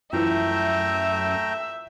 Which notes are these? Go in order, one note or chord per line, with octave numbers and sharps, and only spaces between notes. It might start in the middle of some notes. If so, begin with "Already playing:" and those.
F#2 E3 F3 A3 E5 G5 A#5